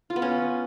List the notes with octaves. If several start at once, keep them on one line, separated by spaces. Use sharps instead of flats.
F4
B3
C#4